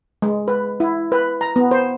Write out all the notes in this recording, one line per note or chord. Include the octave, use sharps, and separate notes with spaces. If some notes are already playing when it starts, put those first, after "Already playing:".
G#3
B4
E4
B4
A#5
B3
C5